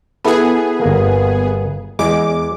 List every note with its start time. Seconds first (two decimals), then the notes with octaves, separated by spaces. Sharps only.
0.24 B3 E4 G#4 A4 B4
0.81 G1 A#3
1.99 E2 G#3 D6